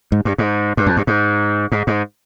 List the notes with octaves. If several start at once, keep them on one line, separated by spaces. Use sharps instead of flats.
G#2
G2
G#2
G2
F2
G2
G#2
G#2
G#2